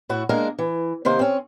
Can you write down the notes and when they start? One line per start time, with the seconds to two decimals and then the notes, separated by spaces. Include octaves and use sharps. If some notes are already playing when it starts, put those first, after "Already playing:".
0.09 A2 E4 F#4
0.29 G#3 A#3 D4 A#4
0.59 E3
1.05 C3 D#3 A#3 C5
1.19 C4 C#4